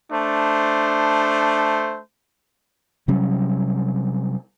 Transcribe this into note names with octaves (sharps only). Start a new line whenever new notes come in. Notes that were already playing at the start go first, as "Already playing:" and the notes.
A3 D4 C5
C3 F#3 G3 C#4